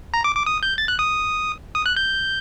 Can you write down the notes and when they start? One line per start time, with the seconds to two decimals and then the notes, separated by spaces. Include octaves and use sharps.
0.14 A#5
0.24 D6
0.35 D6
0.46 D#6
0.63 G6
0.78 A6
0.88 F#6
0.99 D#6
1.75 D#6
1.86 F#6
1.96 G6